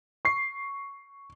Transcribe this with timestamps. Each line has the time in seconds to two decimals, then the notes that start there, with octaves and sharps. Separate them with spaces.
0.25 C#6 C7